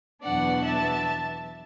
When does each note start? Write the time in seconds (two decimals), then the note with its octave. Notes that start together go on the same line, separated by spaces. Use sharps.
0.23 E2 B2 F#3 B3 D4 D5 F#5
0.65 E5 A5